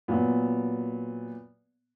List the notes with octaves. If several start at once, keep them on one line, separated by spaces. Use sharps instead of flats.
A#2 F#3 B3